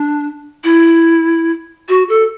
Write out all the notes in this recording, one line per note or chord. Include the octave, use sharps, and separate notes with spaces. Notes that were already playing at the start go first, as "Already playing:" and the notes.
Already playing: D4
E4
F#4
A4